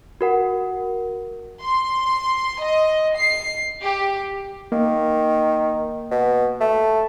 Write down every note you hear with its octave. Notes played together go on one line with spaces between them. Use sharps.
F#4 A#4 F#5
C6
D#5
C7
G4
D#3 A#3
B2
A3